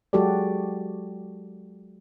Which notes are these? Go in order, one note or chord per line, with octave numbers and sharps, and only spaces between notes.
F#3 G#3 F#4 G4 A4 D5